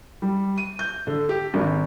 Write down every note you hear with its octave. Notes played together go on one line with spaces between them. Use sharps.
G3
D#7
G6
D3
G4
G#1